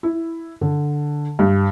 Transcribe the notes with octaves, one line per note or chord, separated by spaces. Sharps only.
E4
D3
G2